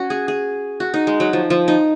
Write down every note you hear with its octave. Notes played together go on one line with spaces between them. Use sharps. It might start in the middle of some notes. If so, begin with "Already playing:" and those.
Already playing: C#4 F#4
G#4
G#4
F#4
D#4
G#3
F#3
F3
F3
D#4